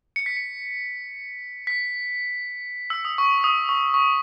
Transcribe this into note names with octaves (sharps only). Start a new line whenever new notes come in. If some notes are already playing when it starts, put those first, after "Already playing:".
C#7
B6
C#7
B6
E6
D#6
C#6
D#6
C#6
C#6